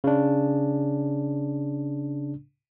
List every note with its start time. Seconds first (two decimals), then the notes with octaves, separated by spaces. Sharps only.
0.04 C#3 D4